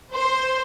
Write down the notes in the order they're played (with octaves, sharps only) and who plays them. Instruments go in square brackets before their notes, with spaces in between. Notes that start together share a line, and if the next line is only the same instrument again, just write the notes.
[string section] C5